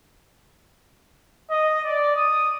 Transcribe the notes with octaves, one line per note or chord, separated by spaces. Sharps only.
D#5
D5
D#6